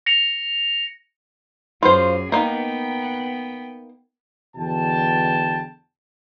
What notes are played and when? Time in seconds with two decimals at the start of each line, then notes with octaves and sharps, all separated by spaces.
0.06 A#6 C#7 F7
1.83 F#2 F4 G#4 C5
2.32 A#3 B3 D#4 G5
4.57 E2 B2 D3 G5 A5